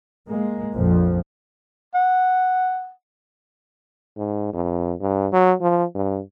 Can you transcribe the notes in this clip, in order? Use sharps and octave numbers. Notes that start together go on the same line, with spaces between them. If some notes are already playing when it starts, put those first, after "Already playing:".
G#3 A#3
A#1 F2 F3
F#5
G#2
F2
G2
F#3
F3
G2